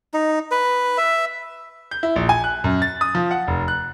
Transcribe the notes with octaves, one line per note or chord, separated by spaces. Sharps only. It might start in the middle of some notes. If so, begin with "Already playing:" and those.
D#4
B4
E5
G6
E4
A#1
G#5
F#6
F#2
A6
D#6
F3
F#5
F1
F#6